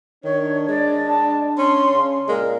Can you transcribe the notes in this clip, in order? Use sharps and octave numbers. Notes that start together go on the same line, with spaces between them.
D#3 D4 C#5
G#3 D5
A5
C#4 C6
C#3
A#2 G#3 A#4